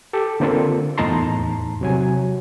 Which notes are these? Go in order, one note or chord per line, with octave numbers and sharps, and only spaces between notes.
G4 A4
D3 A#3 C4 F4 A4
E2 A2 D#4 A5 A#5 C6
C3 F#3 G#5